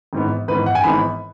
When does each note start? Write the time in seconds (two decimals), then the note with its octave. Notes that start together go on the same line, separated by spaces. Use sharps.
0.13 G#1 G#2 E3 B3
0.48 G#1 G#2 E3 B3 B4
0.66 F#5
0.75 G#5
0.84 G#1 G#2 E3 B3 B5